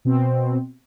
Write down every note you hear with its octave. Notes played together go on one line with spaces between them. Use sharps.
B2 C4